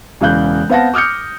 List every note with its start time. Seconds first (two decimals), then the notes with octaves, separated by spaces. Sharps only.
0.21 E1 C#3 E3 F5 F#6 G6
0.69 B3 C4 F5 F#5 A5 A#6
0.94 D6 D#6 F6 G6 C#7